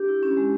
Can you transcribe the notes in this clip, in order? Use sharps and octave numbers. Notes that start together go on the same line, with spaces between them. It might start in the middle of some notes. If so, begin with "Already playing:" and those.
Already playing: D4 G4
E4
C#4
G#3